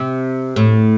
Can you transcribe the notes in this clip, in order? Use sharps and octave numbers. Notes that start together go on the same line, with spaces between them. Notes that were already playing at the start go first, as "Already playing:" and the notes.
Already playing: C3
A2